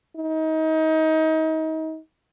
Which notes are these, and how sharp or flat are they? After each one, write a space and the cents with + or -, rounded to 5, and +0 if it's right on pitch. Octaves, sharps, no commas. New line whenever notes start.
D#4 +30